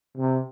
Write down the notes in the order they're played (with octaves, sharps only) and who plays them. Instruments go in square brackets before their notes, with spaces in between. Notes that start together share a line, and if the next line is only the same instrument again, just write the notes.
[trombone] C3